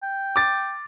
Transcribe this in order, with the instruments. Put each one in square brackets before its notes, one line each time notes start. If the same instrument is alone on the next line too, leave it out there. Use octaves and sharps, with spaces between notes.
[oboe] G5
[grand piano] D6 A6